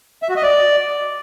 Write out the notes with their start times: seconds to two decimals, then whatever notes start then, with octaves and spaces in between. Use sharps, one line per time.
0.22 E5
0.29 F#4
0.36 D#5
0.43 D5